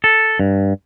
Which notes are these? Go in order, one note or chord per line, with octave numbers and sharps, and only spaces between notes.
A4
G2